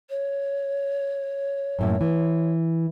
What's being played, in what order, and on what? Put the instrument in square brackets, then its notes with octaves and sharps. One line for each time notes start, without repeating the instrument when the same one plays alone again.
[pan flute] C#5
[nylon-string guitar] F#2 A2 A#3
E3